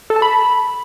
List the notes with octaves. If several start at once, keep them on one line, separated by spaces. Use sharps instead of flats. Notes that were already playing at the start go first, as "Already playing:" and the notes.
A4
A5
B5